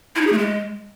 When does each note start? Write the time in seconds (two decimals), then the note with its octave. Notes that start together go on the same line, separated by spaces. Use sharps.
0.16 E4
0.21 D#4
0.27 G#4
0.32 A3
0.38 G#3